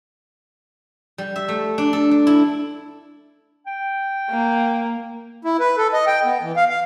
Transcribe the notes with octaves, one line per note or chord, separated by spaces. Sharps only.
G3
E5
A3
D4
A4
D4
E4
G5
A#3
E4
B4
A4
D#5
G5
B3
E3
F5
F5